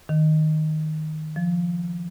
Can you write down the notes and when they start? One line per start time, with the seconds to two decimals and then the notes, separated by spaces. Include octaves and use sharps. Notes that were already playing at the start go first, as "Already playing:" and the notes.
0.09 D#3
1.36 F3